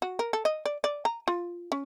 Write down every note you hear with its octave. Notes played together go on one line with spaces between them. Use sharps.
F#4
A#4
A4
D#5
D5
D5
A#5
F4
C#4